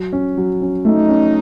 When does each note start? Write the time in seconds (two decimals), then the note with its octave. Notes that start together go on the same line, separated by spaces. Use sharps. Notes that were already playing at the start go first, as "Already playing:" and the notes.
Already playing: F#3
0.13 C#4
0.37 F#3
0.61 C#4
0.85 A3 D#4
1.09 C#4